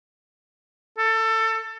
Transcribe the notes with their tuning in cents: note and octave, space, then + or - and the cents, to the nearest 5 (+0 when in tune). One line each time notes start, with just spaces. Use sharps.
A4 +20